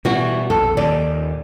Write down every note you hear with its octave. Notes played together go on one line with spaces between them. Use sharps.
B2 E3 G3 F#4
A#1 F2 A4
D#2 A#2 D#3 D5